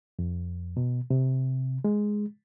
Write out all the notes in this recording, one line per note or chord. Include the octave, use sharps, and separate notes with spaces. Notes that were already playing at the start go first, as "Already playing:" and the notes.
F2
B2
C3
G#3